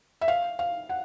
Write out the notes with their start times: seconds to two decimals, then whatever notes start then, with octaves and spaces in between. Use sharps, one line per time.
0.21 E5
0.28 F5
0.59 F5
0.89 F#5